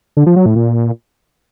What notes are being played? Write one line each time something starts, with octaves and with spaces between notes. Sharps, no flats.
D3
F3
F#3
A2
A#2